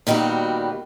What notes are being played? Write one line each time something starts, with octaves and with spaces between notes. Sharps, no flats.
A#2 D#3 G3 B3 F#4